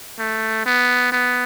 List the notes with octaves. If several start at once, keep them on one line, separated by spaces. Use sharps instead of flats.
A3
B3
B3